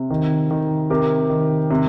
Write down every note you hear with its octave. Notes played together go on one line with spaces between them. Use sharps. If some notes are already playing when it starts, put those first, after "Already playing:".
Already playing: C3
D#3
D#3
C3 G4 A#4
D#3
C3